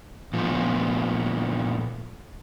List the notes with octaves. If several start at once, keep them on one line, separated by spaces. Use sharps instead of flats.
A#2 F3 A3 B3